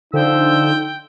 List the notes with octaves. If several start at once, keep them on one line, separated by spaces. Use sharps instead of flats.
D3 F3 D#4 G5 E6